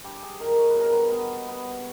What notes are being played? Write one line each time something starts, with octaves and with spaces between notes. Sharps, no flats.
G2 G4
G#4
D#3 A#4
C#5
B4
B2
A#4
B4
B3
B3